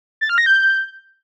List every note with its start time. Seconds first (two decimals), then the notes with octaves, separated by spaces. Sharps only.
0.21 A6
0.29 F6
0.38 A#6
0.46 G6